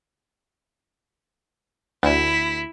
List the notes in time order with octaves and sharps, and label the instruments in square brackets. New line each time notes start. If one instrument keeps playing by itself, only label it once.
[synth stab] D2 [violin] E4 B6